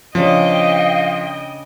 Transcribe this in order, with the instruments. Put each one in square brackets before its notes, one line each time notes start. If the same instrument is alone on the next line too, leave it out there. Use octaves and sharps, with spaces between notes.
[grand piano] C#3 D4 C#5 [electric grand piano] F3 [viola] D#5 G5 [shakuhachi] F5